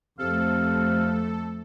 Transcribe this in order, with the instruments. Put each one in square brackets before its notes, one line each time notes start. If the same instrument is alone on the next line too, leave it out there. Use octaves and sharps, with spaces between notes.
[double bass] F2 A3 [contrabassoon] C3 [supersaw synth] A4 [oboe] F5